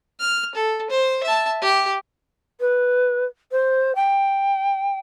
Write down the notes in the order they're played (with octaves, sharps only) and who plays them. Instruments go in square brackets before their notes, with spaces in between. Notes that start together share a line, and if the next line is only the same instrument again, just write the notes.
[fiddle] F6
A4
C5
E5 A5
G4
[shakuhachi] B4
C5
G5